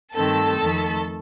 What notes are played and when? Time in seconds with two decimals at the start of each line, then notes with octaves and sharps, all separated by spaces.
0.14 G2 D#3 A3 C4 A4 A5
0.59 F2 D#3 A3